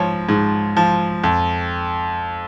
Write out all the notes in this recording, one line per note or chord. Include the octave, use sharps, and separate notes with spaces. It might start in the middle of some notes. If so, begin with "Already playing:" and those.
Already playing: G#2 F3 C#5
G#2
F3
F2